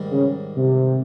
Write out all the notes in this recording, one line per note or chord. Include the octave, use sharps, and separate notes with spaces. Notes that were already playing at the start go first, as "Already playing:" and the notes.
Already playing: G#2 D#3 G3
C#3
C3